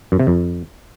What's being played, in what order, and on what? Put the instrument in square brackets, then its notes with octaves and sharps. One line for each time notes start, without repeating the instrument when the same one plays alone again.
[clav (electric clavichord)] F#2
C3
F2